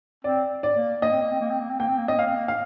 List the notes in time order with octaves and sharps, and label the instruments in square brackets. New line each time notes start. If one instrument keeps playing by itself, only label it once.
[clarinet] C4 [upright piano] D5
[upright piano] D5
[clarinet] A#3
[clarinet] A#3 [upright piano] D#5
[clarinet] C4
A#3
C4
A#3
C4
A#3
C4
[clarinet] A#3 [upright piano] G5
[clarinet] C4
A#3
[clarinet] C4 [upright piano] D#5
[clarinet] A#3 [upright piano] F5
[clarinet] C4
A#3
[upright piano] F5